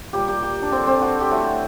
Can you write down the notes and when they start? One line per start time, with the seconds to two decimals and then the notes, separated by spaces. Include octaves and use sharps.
0.13 A#2 G3 G4
0.28 G4
0.43 G4
0.62 D4
0.72 D3 G3 C4
0.87 C4
1.01 F#4
1.20 G4
1.31 A2 A3 F#4